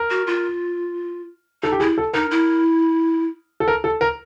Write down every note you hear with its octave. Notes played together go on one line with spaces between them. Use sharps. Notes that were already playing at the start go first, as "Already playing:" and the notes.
Already playing: A#4
F#4
F4
D#4 A4
G4
E4 G#4
A4
D#4 A#4
E4
A4
A#4
A4
A#4